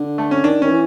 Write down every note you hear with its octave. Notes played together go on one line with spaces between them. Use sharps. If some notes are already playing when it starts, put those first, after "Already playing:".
Already playing: D3
A3
C#4
D#3 D4
D#3 C#4
E3